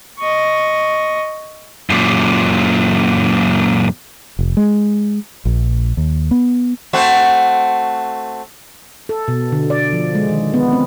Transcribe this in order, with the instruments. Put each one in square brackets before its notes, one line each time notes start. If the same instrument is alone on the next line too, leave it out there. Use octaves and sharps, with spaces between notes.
[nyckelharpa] D#5 C#6
[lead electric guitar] F#2 A#2
[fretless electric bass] F1
G#3
A#1
D#2
B3
[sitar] A3 C4 F#4
[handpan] A4
B2
D3
D5
F3
G#3
D#3
B3
C4